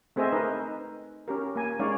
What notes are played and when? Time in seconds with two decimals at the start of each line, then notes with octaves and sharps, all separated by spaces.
0.16 A3 C4 G#4 C5 D#5 E5
0.33 D#4 A#4 B4 D#5
1.28 C#4 G4 A#4
1.56 A#3 G#5
1.79 G#3 C#4 D#4 C#5 D5 F5